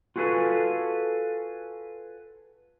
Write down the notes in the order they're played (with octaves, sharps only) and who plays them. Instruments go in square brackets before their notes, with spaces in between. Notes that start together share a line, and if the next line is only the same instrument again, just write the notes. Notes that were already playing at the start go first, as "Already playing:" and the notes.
[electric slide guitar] F4 F#4 G#4 A4 B4